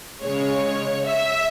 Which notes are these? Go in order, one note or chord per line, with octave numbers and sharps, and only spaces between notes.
C#3 G#3 C#5
E5